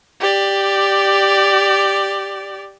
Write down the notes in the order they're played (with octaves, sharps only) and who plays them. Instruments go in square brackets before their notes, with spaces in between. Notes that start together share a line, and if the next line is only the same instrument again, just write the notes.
[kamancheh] G4 D5